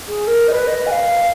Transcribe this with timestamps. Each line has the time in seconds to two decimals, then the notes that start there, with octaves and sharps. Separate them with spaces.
0.07 G#4
0.27 A#4
0.47 D#5
0.51 B4
0.67 D#5
0.86 G#5
0.91 F5